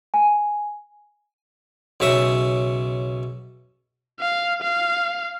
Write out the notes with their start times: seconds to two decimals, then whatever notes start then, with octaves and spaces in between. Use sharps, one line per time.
0.14 G#5
2.00 B1 C#3 E5 C#6 D#6
4.20 F5
4.62 F5